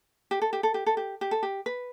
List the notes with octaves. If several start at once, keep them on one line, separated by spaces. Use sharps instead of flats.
G4
A4
G4
A4
G4
A4
G4
G4
A4
G4
B4